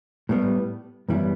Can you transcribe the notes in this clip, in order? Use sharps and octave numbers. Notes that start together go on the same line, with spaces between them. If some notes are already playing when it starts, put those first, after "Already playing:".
A2 G3 B3
F#2 E3 G3 B3 E4